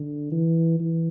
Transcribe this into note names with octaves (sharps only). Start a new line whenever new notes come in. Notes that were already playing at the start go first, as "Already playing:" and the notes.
Already playing: D3
E3
E3